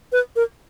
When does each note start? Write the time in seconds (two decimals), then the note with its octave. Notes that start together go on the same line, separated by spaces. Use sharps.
0.12 B4
0.36 A#4